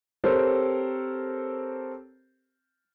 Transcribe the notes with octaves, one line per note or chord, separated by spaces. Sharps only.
C4 G4 A4 A#4 C5 C#5